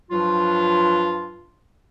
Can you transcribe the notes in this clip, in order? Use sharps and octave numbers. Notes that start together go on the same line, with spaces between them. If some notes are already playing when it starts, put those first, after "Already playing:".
G2 F3 F#3 F4